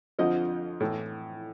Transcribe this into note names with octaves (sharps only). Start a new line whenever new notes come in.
F2 D3 F3 D#5
A2 E3